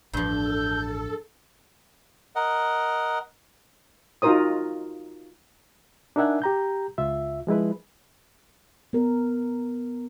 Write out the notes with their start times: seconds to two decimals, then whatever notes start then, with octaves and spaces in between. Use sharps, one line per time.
0.13 A1 E2 G2 F3 A4 G6
2.36 A#4 D#5 F#5
4.22 D#4 F4 F#4 A#4 C5 D#6
6.16 D4 D#4 A#4 E5 F#5 G#5
6.42 G4 A#5 G6
6.98 C#2 F4 E5
7.47 F3 G#3 E4 B4
8.93 B3 A#4